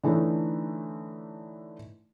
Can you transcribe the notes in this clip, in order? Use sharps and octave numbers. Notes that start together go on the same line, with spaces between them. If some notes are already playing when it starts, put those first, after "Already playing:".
D3 E3 A3 D#4 C#5